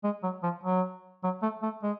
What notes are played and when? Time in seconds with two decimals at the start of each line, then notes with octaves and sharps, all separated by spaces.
0.04 G#3
0.23 F#3
0.43 F3
0.64 F#3
1.24 F#3
1.42 A3
1.63 A3
1.83 G#3